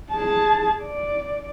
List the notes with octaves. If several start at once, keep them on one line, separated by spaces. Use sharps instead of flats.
G#4 A5
D5